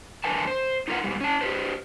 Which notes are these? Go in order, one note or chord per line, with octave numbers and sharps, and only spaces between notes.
F#2 D3 A#4 B4 G#5 A5
C5
D#4 F4 A#4 B4 F#5
G#2 B2 G3
C#4 A5
G4 B4 C5